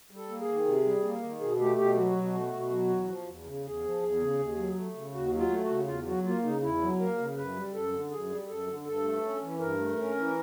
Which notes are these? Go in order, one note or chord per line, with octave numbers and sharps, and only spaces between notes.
G3
A4
A#3
G#4
D#3
C3
G3
A#3
D#3
B2 G#4
A3 G4
B2 G4
F#3 F#4
B2
A3
B2
F#3
E2
F3
E2
C#3
E2 G#4
F3
E2
C#3
D#2
F#3
A3
C#3
D#2 F#4
F#3
F4
A3
F#4
C#3
E2 F4
F#3 F#4
A#3 F4
C#3 D#4
E2 E4
F#3
A#3 A#4
C#3
F#2 B4
G3
F#2 A4
D3
F#2 G#4
G3
F#2 A4
D3
G2 A4
A3
C#4
E3
G2 A#4
A3
C#4
E3